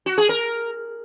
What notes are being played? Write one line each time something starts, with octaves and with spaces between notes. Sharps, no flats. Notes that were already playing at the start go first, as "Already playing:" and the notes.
F#4
G#4
A#4